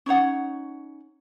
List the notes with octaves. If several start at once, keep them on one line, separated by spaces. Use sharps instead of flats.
C#4 D#4 C#5 F#5